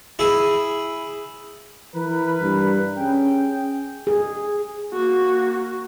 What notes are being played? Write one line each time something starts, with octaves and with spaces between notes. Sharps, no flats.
E4 G#4
E3 A#4 B4
G2
C#4 G#4 G5
G#4
A#3 F#4